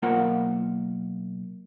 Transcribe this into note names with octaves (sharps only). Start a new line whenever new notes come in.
B1 A#3 F4 A#4 C5 F#5